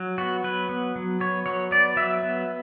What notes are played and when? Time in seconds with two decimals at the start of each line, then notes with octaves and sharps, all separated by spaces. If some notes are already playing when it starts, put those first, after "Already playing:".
Already playing: F#3
0.18 B3 F#4
0.44 F#3 B4
0.69 B3
0.96 F#3
1.20 B3 C#5
1.46 F#3 C#5
1.71 B3 D5
1.97 F#3 E5
2.23 B3